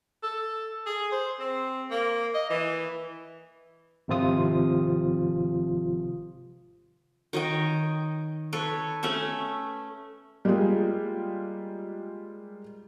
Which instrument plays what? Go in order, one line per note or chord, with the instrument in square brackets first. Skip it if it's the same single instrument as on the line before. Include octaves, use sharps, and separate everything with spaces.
[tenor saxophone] A4
G#4
C5
C4
A#3
D#5
E3
[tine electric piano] G#1 C3 F3 F4 D#6
[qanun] D#3 C#5 D#5 G5
A4 B4 C#5
A3 C#4 C#5 E5
[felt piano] G3 G#3 A#3 F4 G#4